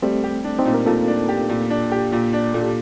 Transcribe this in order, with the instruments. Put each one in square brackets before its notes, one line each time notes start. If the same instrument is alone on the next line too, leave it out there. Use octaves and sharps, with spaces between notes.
[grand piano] G3 [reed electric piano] A3 C4
[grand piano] G4
D4
[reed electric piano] C4 D#4
[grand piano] A#2
[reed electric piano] A#4
[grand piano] A#2 [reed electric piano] F4 A4
[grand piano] D4
G4
A#2
D4
G4
A#2
D4
[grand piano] A#2 [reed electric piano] A4
[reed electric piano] G4